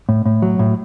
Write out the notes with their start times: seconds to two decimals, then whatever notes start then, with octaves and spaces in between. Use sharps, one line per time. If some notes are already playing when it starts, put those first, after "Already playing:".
0.09 A2
0.26 A2
0.42 F#3
0.59 A2